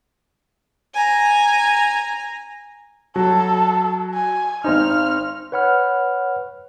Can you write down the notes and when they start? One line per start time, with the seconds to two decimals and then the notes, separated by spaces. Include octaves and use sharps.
0.94 G#5 A#5
3.16 F#3 A4
4.14 G#5
4.64 G#1 C4 D#4 F6
5.52 B4 C#5 F#5 B5 F6